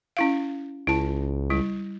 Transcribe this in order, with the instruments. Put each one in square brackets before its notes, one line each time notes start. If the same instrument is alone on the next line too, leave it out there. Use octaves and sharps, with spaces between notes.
[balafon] C#4 E4 F5
[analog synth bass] C#2 [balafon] E4 A5
[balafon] G3 E4